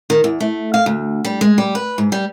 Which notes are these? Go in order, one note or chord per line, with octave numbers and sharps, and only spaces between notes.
D#3
E2
A3
F5
D2
G3
G#3
G3
B4
G#2
G3